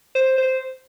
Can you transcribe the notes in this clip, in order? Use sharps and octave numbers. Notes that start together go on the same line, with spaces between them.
C5
C5